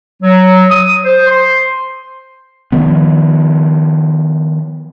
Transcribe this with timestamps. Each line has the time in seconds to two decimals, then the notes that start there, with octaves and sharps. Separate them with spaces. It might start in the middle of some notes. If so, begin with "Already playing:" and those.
0.22 F#3
0.69 D#6
1.05 C5
1.27 C6
2.72 D#3 F3 B3